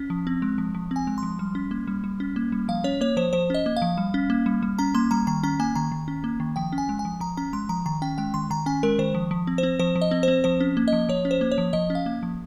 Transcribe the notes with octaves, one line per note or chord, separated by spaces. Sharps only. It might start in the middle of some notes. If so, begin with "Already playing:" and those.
Already playing: C#4
F3
C4
G#3
F3
F3
C4 G#5
G#3
F3 C6
G3
C#4
A#3
G3
G3
C#4
A#3
G3
F3 F5
C#4 C#5
A#3 C#5
F3 C5
F3 C5
C#4 D#5
A#3
F5
F3
G3
C#4
A#3
G3
G3
C#4 A#5
A#3 C6
G3 A#5
D#3 A#5
C#4 A#5
A#3 G#5
D#3 A#5
D#3
C#4
A#3
D#3
F3 G5
C#4
G#5
G#3
G#5
F3
F3 A#5
C#4 A#5
G#3 C6
F3 A#5
D#3 A#5
C#4 G5
G#3 G5
D#3 C6
D#3 A#5
C#4 G#5
G#3 A#4
D#3 C5
F3
F3
C4
C5
C4
F3 C5
F3
D#5
C4
C4 C5
F3 C5
C#4
A#3
F3 D#5
F3 C#5
C#4
C5
A#3
C#5
F3
F3 D#5
C#4
F5
A#3
F3